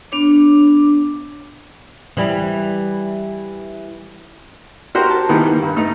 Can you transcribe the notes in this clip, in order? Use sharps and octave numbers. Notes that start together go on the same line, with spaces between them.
B3 D4 C#5 D6
E3 G3
F#4 G4 A#4 C5 C6
A5
D#3 E3 G3 A#3 B3
A#3
G2
A3 D#4